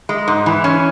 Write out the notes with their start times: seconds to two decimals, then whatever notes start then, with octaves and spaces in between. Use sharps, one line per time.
0.09 G#3
0.28 G#2
0.46 E3
0.64 C#4